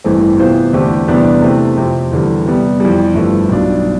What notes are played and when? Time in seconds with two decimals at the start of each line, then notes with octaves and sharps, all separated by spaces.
0.04 A1 G2 E3 A3 C4
0.38 C3 E3 B3 F4 C5
0.73 E2 D3 A3 C4 G4
1.08 E2 C3 G3 B3 D4
1.42 C3 E3 A3 C4
1.77 F2 C3 F3 C4
2.12 E2 D3 G3
2.46 C3 G3 B3
2.80 F2 E3 G3
3.14 G1 G2 F3 A3 E4
3.49 B1 B2 G3 D4 F4